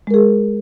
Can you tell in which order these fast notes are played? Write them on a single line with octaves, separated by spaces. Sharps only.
G#3 A#4 G#4